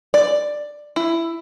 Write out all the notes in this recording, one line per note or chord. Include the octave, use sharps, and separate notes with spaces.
D5
E4